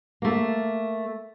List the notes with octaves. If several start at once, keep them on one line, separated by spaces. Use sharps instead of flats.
A3 A#3